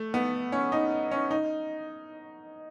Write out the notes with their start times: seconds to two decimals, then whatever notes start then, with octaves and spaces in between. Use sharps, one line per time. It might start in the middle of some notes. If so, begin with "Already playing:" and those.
Already playing: A3
0.14 B3
0.52 C#4
0.72 D#4
1.11 C#4
1.31 D#4